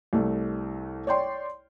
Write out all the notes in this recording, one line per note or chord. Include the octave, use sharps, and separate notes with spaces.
C2 A3
C#5 D5 G5 C6